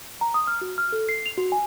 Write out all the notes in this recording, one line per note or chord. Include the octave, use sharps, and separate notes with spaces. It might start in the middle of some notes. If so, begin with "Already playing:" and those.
A#5
D#6
F6
F#4
F6
A4
C7
F7
F#4
G#5